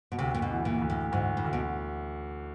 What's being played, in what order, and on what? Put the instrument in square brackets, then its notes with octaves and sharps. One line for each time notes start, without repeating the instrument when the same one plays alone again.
[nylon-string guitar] B2
[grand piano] D2 [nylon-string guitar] C3
[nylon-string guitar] A#2
B2
[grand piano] E3
[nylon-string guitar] A#2
[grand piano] D2
[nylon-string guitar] A2
[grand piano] D2 [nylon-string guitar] G#2
[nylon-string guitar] A2
[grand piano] D2
[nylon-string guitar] B2